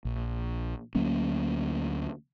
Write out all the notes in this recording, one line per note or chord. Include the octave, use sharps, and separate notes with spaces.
A#1
D2 F#3 A#3 C#4